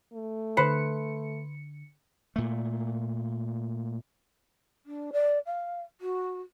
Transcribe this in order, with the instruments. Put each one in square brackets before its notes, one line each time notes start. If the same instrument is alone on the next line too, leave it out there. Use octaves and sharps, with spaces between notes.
[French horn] A3
[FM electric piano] D3 C#7 [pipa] B4 C5
[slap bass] A#2 A3
[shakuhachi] D4
D5
F5
F#4